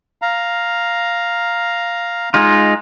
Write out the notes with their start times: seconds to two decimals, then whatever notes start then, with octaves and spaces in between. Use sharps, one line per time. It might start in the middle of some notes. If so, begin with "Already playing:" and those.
0.22 F5 A#5
2.34 G#3 D#4 F4